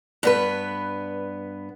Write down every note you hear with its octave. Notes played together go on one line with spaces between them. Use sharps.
G2 B3 B4